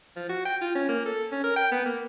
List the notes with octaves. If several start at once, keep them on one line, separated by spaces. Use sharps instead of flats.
F3
F#4
G5
F4
C#4
A#3
A4
C#4
A#4
G5
B3
A#3